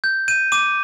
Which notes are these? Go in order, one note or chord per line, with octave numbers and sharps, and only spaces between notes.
G6
G6 D#7
D6 D#7